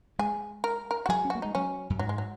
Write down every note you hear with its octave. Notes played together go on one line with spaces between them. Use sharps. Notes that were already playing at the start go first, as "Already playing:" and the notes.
G#3 G#4
A#4
A#4
F#4
F#3 G#4
C#4
A#3 F#4
G#3 D#4
F#3 C#4
F#2
G#2 F#3
G#3
F#3